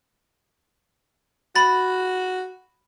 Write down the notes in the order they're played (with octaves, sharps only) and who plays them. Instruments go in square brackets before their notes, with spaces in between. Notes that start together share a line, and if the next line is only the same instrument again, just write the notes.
[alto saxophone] F#4 [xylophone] B5 A6